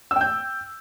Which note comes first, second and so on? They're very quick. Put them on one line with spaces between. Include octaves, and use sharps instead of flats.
E6 G5 G6